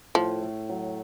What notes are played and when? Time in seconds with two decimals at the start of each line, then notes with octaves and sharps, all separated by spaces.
0.15 A2 F3
0.42 A3
0.69 F#3